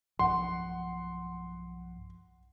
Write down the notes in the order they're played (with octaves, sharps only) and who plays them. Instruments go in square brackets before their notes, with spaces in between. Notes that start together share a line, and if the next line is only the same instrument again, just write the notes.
[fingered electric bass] B1 G2 F3 [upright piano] F#5 [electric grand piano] C6